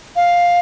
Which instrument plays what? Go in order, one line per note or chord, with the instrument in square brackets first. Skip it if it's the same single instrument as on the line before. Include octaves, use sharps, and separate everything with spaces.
[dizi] F5